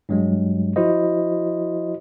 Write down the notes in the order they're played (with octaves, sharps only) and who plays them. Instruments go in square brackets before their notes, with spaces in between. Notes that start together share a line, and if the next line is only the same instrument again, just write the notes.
[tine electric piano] G2 F#3 G#3
F3 E4 F#4 C5 D#5